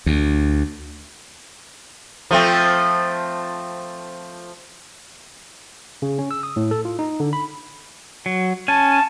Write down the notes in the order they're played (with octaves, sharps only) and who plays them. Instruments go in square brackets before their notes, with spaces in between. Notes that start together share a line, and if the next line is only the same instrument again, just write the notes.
[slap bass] D2
[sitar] F3 A3 C4
[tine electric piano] C#3
C#4
E6
D#6
A2
A4
F4
D#4
D3
B5
[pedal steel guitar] F#3
[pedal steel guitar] C#4 G#5 [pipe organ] A5